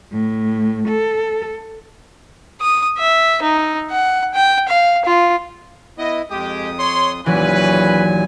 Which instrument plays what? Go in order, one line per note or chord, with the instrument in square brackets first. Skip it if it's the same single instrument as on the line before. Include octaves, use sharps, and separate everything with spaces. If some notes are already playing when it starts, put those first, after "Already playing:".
[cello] A2
A4
[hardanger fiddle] D#6
E5
D#4
F#5
G5
F5
F4
[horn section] B3 D#5 [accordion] E4
[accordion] F2 D#6 [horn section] G#3 G4
[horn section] C#5 C6
[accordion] D#2 A#2 G#5 [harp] E3 F#3 [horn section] C#4 B4